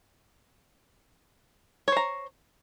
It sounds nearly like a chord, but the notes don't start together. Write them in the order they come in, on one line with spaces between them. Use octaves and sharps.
C#5 C5 A#5